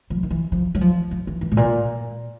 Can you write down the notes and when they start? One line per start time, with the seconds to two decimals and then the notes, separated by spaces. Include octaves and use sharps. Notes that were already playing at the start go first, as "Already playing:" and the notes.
0.10 F3
0.23 D#3
0.31 E3
0.52 F3
0.75 F#3
0.81 F3
1.11 F3
1.27 E3
1.41 E3
1.52 A2
1.57 A#2